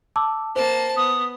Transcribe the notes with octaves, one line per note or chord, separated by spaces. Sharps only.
A5 D6 E6
A#3 C5 A5
B3 D#6